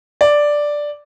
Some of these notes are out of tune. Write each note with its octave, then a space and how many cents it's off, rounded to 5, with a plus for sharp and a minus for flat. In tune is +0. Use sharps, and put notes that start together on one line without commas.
D5 +0